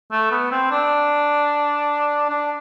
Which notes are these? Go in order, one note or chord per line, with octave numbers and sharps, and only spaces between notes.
A3
B3
C4
D4
D4